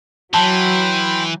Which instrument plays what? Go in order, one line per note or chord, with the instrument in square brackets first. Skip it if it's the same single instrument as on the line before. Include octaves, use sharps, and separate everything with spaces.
[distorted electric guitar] E3 [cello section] F#3 [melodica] G5 B5 C6 [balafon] A5